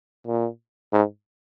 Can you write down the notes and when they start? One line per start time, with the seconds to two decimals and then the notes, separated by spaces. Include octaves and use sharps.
0.27 A#2
0.93 G#2